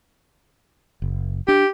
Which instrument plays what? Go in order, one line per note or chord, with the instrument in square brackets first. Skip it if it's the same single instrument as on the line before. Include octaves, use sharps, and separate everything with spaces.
[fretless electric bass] F#1
[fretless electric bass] D4 [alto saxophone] G4